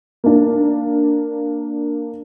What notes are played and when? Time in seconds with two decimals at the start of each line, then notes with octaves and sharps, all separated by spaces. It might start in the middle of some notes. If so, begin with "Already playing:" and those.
0.24 A#3 D4